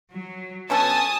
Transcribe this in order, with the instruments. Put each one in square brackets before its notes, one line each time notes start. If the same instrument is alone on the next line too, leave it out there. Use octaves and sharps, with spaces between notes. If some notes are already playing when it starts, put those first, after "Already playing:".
[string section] F#3
[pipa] B2 C#4 A4 [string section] G#5 A5 D#6